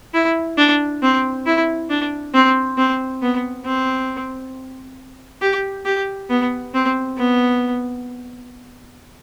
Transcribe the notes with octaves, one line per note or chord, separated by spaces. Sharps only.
E4
D4
C4
E4
D4
C4
C4
B3
C4
G4
G4
B3
C4
B3